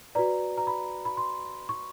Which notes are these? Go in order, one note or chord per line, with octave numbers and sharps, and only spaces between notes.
F#4 B4 D5 A#5
A#5
B5
B5
C6
C#6